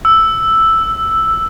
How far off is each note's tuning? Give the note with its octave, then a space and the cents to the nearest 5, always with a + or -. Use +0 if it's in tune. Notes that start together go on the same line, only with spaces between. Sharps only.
E6 +0
E6 +10